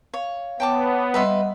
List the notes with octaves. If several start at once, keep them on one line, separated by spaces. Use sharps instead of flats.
C#5 F5
B3 C#5 G5 A5 D6
G3 B4 D#5 E5 F#5 C6